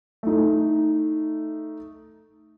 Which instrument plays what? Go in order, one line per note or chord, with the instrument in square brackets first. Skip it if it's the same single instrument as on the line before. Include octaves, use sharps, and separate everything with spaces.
[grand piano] A3 D#4